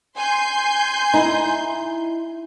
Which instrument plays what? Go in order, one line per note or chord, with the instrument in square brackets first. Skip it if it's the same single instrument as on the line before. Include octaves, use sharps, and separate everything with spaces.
[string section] G#5 C6 G6
[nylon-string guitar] D#4 E4